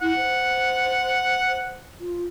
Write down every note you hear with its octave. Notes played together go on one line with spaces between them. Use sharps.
E4 F#5
C5
F4